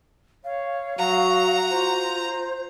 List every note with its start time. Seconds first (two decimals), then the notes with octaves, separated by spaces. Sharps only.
0.44 C#5 F5
0.99 F#3 F#4 A#5
1.70 F4 C5